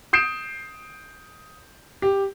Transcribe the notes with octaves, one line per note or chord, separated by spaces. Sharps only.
D#6 G6 C7 D7 E7
G4